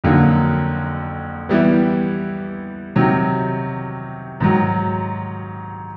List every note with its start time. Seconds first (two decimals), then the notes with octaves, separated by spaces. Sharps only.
0.04 F2 D3 F#3 A#3 D#4
1.49 E3 G3 B3 E4 G4
2.96 C3 D#3 F#3
4.40 G#2 D#3 F#3